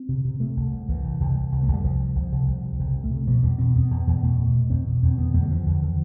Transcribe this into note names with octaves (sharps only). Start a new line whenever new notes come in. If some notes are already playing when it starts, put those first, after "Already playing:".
Already playing: C4
C3
C3
C3 A3
C2
C2
C2 E3
C2
C2
C2
C2
C2 A3
G3
C2 F3
C2
C2
C2
C2
C3
C2
C3
A3
C3
B2 F3
E2 G3
B2 C4
E2 B3
E2
E2
B2 A3
B2
B2
E2 C4
B2
E2 C4
D3 B3
E2 A3
G3
D3 F3
E2
D3